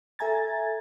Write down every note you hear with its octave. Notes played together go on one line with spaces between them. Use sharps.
A4 E5 G#5 A#5 G#6 A6